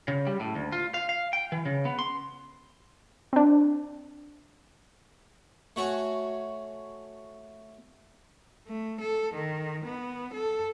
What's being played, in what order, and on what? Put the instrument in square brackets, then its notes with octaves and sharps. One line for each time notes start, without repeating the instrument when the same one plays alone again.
[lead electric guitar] C#3
G3
A2
D2
F4
F5
F5
G5
E3
C#3
B3
C6
[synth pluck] C4 D4
[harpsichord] A3 F#4 C#5 G#5
[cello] A3
A4
D#3
B3
A4